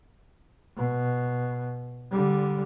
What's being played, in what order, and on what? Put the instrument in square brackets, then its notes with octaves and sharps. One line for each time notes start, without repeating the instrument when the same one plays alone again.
[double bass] B2
D3 G3